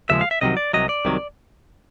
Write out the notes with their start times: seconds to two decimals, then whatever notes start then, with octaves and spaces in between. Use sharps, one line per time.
0.10 D#2 C#3 F3 G#3 E5
0.21 F5
0.31 E5
0.41 C2 C3 D#3 F#3 D#5
0.57 D5
0.73 C2 C3 F#3 D#5
0.89 D5
1.05 C2 C3 D#3 F#3